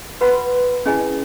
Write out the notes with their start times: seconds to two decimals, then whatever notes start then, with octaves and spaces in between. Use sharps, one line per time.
0.21 F#4 B4 F#5 B5
0.86 C#4 E4 G#4 D#5 G#5